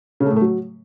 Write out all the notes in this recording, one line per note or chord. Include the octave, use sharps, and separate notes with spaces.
C#3
A3
A2
A3
F#3